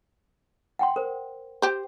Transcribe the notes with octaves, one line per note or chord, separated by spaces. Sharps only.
F#5 G5 C6
A#4 C5
G4 C5